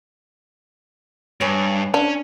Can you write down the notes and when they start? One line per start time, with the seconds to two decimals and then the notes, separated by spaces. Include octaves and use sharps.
1.41 G2 B4 C#5 G#5
1.94 C#4 D4